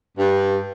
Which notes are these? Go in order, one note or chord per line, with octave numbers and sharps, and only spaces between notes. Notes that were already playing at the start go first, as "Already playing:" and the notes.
G2